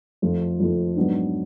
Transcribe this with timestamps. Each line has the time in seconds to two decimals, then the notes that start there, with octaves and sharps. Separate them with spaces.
0.22 F2 F3 A3 F4
0.60 F2 F3 A3 F4
0.97 G#2 F#3 B3 D4